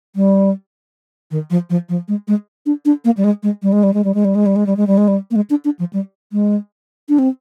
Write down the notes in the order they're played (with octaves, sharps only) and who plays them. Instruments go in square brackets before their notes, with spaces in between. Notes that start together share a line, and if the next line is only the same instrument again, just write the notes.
[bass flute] G3
D#3
F3
F3
F3
G#3
G#3
D4
D4
A#3
G3
G#3
G#3
G3
G#3
G3
G#3
G3
G#3
G3
G#3
G3
G#3
G3
G#3
G3
G#3
G3
A#3
G#3
D4
D4
F3
G3
G#3
D4
C4